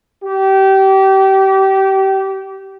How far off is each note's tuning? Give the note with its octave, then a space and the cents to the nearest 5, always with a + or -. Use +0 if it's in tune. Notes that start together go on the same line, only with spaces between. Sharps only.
G4 -25